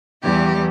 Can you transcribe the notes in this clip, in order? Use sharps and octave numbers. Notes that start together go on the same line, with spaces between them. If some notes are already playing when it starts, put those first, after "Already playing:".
E2 E3 G3 G4